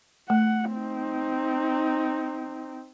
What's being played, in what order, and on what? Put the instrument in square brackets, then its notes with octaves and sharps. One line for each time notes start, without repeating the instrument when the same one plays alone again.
[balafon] A3 [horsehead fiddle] F#5
[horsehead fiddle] C4 D#4